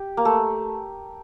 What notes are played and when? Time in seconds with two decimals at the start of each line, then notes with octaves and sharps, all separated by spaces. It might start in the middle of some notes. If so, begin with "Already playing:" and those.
Already playing: G4
0.17 A#3
0.25 A3